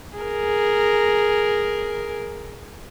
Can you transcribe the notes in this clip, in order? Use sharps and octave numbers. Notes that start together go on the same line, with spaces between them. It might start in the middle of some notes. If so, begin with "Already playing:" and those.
G#4 A#4